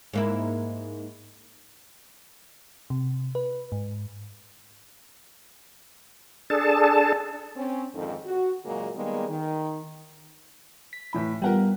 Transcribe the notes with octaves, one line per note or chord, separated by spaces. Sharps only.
G#2 A#3 E4
C3
B4
G#2
D4 G#4 A4 A5
C4 C#4
F2 G#2 D3 D#3 A4
F#4
F#2 A#2 C#3 F#3 G#3 A#3
D#3 G3 G#3 A#3 B3
D#3
B6
A2 E3 B5
G3 B3 F4 A#4 F#5 G5